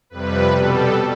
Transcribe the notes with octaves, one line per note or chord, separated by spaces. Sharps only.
F2 C3 G3 B4
B2 G3 A4